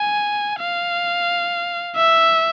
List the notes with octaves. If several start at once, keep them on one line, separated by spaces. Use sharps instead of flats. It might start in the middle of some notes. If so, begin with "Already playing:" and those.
Already playing: G#5
F5
E5